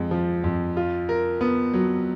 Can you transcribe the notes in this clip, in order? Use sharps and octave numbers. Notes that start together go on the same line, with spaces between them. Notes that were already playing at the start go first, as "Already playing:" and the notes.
Already playing: F2 G#3
F3
F2
F4
A#4
B3
F#3